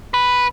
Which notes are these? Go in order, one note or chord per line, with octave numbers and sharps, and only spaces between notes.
B4